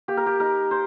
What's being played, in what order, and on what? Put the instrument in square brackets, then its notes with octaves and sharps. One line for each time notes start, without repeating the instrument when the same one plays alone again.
[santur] A#3 G4
A#4
G4
D#4 A#4
C5